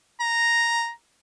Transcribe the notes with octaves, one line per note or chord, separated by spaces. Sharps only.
A#5